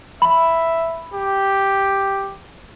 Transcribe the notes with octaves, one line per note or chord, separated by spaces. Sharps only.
E5 B5
G4